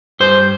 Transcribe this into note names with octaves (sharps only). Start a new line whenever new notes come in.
G2 C5